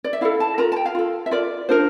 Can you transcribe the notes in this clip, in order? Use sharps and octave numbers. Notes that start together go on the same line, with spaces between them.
D5
E5
E4 A4 F5
A5
F4 A#4 A#5
A5
G5
F5
F4 A4
E5
F4 A#4 D5
D4 F4 A#4 C5